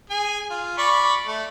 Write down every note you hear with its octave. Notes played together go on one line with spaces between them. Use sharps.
G#4 G#5
F4
D5 B5 C#6
A3